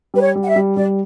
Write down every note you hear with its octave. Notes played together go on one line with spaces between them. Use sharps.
G3 B4
C#5
G3
F#5
E5
G3
G3 D5